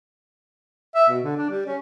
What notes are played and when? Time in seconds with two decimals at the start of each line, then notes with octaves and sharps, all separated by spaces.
0.95 E5
1.09 B2
1.23 D3
1.36 D4
1.50 G3
1.66 C#4